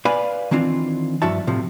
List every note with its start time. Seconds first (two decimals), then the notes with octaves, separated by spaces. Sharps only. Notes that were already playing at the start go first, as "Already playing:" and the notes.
0.05 B4 D5 F5 G#5 B5
0.51 D#3 E3 C4 D4 F4
1.22 G2 F3 E4 F#4 E5 A5
1.47 A2 C3 F3